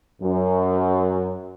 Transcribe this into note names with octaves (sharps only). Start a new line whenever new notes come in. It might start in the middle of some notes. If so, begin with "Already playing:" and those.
F#2